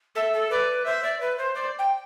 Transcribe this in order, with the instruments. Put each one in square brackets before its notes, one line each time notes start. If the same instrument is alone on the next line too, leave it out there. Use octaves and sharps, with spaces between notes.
[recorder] A4 [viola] E5
[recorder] A4
[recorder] B4 [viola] D5
[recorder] C5 [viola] E5
[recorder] D5
B4
C5
[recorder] C5 [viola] D5
[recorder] G5